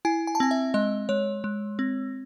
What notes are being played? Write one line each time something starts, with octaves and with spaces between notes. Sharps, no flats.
E4 G#5
G#5
A5
C4 G#5
E5
G#3 D#5
G#3 C#5
G#3
C4